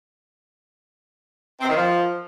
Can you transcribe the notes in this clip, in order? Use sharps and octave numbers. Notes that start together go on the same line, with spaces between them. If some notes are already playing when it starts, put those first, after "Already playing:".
C4
D#3
F3